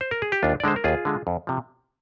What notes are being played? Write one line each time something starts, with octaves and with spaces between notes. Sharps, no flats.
C5
A#4
G#4
G4
D#2 D4 F4
D5
D3 G#3 C5
A#4
D#2 F4 G#4
D3 G#3
F2
C3 F3